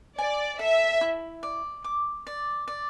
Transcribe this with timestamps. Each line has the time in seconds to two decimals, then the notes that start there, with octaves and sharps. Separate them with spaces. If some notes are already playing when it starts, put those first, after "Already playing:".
0.18 D5 G#5
0.59 A4 E5
1.01 E4
1.43 D5
1.84 D6
2.27 D5
2.68 D5